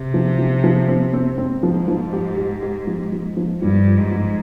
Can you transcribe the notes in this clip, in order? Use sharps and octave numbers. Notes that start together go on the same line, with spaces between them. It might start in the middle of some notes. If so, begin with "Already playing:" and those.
Already playing: C3 C4
F3
F3
F3
C4
C4
G#2 C4
F3
F3
G4
G4
G4
F3
F3
F3
G2 F3
F4
G#2
F3